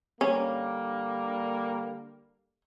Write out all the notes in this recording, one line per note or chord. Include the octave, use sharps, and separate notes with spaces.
D3 G3 A#3 C#4